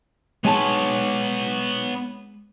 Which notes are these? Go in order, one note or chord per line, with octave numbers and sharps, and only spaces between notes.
G#3 B3 C#5 G#5 A5